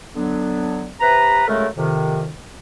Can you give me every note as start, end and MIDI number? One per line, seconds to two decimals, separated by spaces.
0.15 0.89 50
0.15 0.89 54
0.15 0.89 59
0.15 0.89 62
1.01 1.44 48
1.01 1.44 71
1.01 1.44 82
1.47 1.66 49
1.47 1.66 54
1.47 1.66 56
1.47 1.66 57
1.47 1.66 69
1.47 1.66 70
1.77 2.29 41
1.77 2.29 48
1.77 2.29 51